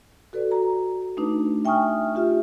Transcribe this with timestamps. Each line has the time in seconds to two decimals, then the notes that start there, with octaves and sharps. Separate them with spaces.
0.33 F#4 A4 B4 D5
0.51 A#5
1.17 A3 D4 D#4 B4
1.65 E5 G5 G#5 C#6 D#6 F6
2.15 F4 G4 E5